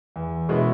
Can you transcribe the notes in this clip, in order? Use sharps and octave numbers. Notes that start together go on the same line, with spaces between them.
E2
B2 G#3 C#4 E4